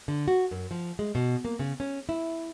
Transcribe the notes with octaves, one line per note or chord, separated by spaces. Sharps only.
D3
F#4
F#2
F3
G#3
B2
A#3
C#3
C#4
E4